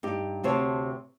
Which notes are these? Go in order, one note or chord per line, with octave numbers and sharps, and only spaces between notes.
G2 D#4 G4
D2 C3 C5 C#5 A5